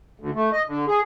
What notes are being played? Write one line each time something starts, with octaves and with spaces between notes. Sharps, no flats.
D2
A3
D#5
D3
G#4